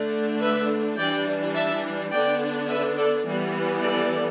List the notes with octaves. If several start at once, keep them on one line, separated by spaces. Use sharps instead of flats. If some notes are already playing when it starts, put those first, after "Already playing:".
Already playing: D3 A3 D4
B4 E5
E3 G3 D4 D5 G5
E5 A5
D3 B3 D4 D5 G5
B4 E5
A4 D5
E3 G3 B3
A4 D5